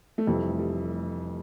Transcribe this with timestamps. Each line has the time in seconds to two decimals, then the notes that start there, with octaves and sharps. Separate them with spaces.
0.18 A3
0.27 F1 F2 E3 G3
0.59 G3